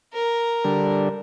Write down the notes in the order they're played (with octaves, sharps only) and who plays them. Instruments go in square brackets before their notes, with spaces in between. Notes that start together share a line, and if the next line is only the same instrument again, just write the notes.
[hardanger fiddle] A#4
[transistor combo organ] D3 G3